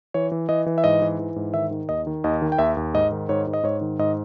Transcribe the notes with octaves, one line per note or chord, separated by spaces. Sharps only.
E3 C#5
E3
E3 D#5
E3
E5
G#2 D#5
E3
E3
G#2
D#3 E5
D#3
D#2 D#5
D#3
D#2 D#5
D#3
G5
D#2 E5
D#2
G#2 D#5
D#3
G#2 C#5
G#2
D#5
G#2 C#5
D#3
G#2 D#5